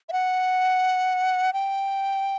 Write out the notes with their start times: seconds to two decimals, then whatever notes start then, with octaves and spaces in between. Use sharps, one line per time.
0.09 E5
0.12 F#5
1.53 G5